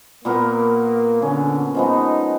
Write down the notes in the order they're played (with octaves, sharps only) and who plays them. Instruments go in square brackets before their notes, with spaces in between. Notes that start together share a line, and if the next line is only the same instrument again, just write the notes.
[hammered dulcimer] A#2 B3 A#4 [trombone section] A#3
[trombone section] D3 [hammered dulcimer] C#4
[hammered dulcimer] F3 G#3 B3 [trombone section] D#4